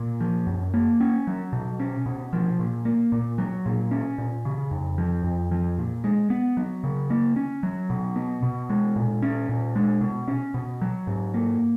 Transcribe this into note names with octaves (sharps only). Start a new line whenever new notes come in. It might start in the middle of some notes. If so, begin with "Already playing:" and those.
Already playing: A#2
F3
F#2
A#3
C#4
F#3
B2
C#4
B2
F3
A#2
A#3
A#2
F#3
A#2
C#4
A#2
C#3
F2
F3
F2
F3
A#2
G#3
B3
F#3
C#3
A#3
C#4
F#3
B2
B3
B2
G#3
A#2
C#4
A#2
G#3
B2
C#4
B2
F#3
G#2
A#3